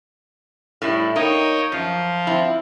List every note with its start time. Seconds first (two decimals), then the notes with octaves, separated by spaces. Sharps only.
0.82 A2 G3 E4
1.16 A#3 D#4 C#5 D#5 G5
1.72 F#2 F3 F4
2.27 C4 E4